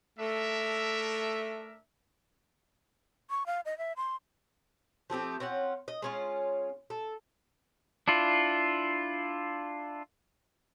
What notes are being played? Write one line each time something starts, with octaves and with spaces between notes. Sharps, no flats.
A3 D4 A#4 E5
C#6
F5
D#5
E5
C6
F3 A3 C4 G4
C4 C#4 F4 F#5
D#5
G#3 C#4 F4
A4
D4 E4 F4